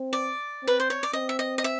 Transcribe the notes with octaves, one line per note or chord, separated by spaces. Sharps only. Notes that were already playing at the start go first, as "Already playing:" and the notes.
Already playing: C4
D5
C4 B4
C5
C#5
D5
C4 D#5
E5
D#5
D#5
E5